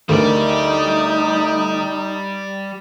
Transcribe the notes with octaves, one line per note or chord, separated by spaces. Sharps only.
D2 G3 D#4 A#4 D5